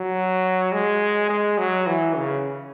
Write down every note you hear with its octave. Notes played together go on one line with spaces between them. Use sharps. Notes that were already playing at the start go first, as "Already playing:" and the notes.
Already playing: F#3
G#3
G#3
F#3
E3
C#3